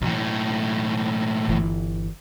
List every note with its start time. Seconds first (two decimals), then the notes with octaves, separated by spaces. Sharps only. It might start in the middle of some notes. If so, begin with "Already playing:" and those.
0.02 B1 A2 E3 A3
1.47 G1 E3